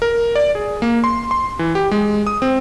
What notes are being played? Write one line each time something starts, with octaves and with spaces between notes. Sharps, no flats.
A#4
D5
G#4
A#3
C6
C6
E3
G4
G#3
D#6
C4